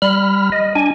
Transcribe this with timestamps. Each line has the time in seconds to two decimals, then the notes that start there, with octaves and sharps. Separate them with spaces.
0.02 G3 B5 F6
0.52 D#5
0.75 D4 G#5